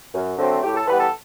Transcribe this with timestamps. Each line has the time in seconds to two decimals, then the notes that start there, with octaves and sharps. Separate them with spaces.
0.14 F#2
0.38 D3 F#3 A3 C4
0.63 A2 G4
0.75 A4
0.87 E3 G3 B3 B4
0.99 A4